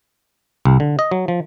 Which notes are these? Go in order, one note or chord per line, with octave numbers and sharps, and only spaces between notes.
C2
D3
D#5
F#3
F3